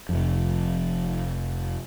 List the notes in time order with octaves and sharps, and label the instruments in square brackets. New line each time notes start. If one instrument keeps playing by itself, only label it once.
[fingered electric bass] F1 F2